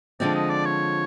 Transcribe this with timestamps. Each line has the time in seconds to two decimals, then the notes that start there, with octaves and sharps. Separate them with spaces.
0.20 D3 F3 G#3 C4 D5
0.35 D#5
0.50 D5
0.65 C#5